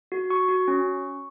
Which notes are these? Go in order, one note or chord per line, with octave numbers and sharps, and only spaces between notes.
F#4
F#4 C#6
F#4
C#4